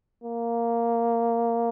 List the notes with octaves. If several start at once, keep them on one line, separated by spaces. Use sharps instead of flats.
A#3